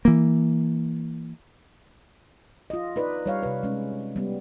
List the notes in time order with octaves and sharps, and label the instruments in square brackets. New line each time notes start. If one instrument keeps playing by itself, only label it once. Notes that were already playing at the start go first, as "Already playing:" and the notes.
[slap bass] E3 A#3
[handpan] F4 D#5
D#4 B4 D5 D#5
G3 C#5 F5
C3 B4
G#3 C#4
G3 B3